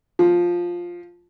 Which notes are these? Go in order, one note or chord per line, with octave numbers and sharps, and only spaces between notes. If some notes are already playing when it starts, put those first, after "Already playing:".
F3